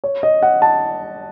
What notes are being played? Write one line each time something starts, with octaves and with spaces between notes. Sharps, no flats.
C#5
D#5
F#5
A5